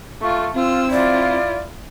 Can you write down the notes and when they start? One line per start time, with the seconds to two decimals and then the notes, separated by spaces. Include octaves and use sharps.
0.21 A3 F4 C#6
0.54 C4 F4 E6
0.91 E4 F4 D5